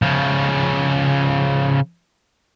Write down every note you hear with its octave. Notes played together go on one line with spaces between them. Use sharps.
C#3 F3